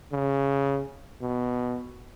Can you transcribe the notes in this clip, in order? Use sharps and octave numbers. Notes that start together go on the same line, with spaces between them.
C#3
B2